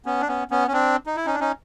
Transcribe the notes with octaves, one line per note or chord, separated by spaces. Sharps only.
B3 C#4
D4
B3 C#4
B3 C#4
C#4
C4 D4
D#4
E4
C#4 D#4
D4
C#4 D#4